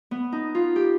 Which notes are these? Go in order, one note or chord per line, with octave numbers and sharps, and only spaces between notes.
B3
D#4
F4
G4